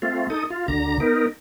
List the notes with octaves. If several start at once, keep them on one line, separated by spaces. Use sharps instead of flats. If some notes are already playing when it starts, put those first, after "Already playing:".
A3 C4 F4
D#4 A4 D#6
F4
D2 D3 A#5
B3 D#4 A#4